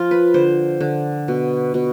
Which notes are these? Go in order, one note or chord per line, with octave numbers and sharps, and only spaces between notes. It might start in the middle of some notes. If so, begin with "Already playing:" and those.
Already playing: F3 F4
B4
D3 C5
D3
B2
B2